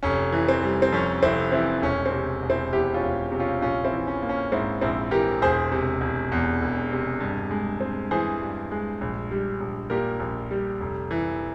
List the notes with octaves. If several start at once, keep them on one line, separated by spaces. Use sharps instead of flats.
F1 C#4
E3
C4
G3
C4
F2 C#4
F1 C4 E4
E3 C4 E4
E1 C#4
C4
C3
E1
C4 E4
E2 E4 G4
C#4 F4
E1
C3
C#4 F4
A#1 C#4 F4
C4 E4
E3
C#4
A#3
C#4
G#2 C4 E4
A#1 C4 E4
E3 G4 A#4
E1 G#4 C5
C3
E1
E2
E1
C3
G2
G#3
C4
E3 G#4 C5
G2
G#3
A#1
G3
A#1
A#2 G4 A#4
A#1
G3
F1
E3